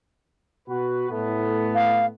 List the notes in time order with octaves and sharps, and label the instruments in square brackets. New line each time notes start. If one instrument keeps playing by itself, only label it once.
[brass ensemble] B2 F#4 B4
A2 A3 B3
[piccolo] F5